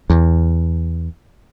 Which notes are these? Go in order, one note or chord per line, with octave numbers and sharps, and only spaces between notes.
E2